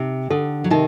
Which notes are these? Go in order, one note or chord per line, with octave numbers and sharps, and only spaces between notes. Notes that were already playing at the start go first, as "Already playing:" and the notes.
Already playing: C3 D#4
D3 A4
F#3
C3 D#3 D#4